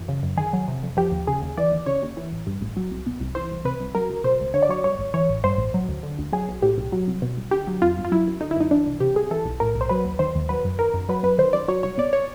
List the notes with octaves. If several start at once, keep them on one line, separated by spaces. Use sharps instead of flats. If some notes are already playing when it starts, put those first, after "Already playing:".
Already playing: F#2 E3
C#3
F#2
D#3 G#4
F#3
C3
F2
F3 G4
D#2
C#3 G#4
D#2
E3 D5
D#2
C#3 C#5
D#2
E3
A1
G2
A1
F#3
C2
B2
C2
E3 C5
C2
C3 B4
C2
F#3 A#4
C#2
B2 C5
C#2
D3 C#5
D5
F#3 C#5
G2 C#5
G#1
E3 C#5
A1
G2 C5
A1
F#3
D2
D3
D2
F#3 G#4
B1
A2 G4
B1
F#3
C2
B2
C2
D3 G4
F#3
F2 F4
G1
F4
F#3 E4
F#2
D3 D#4
E4
F#2 D#4
E3 D4
C2
C3 G4
C2 G#4
E3 A4
B1
A2 A#4
B1
C5
F#3 B4
D#2
D#3 C5
D#2
F#3 B4
F#2
D#3 A#4
F#2
F#3 B4
F#2 B4
D#3 C5
F#2 D5
F#3 C#5
C2 C#5
B2 D5
C#5